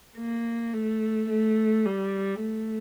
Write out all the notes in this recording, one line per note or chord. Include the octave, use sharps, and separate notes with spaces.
A#3
A3
A3
G3
A3